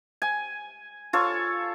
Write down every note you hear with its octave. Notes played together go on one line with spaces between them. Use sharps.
G#5
F4 A4 C#5